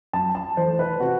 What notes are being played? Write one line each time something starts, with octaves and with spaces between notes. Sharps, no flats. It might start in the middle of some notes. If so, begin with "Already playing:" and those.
F#2 A5
A5
E3 A3 C5
B4
C3 F#4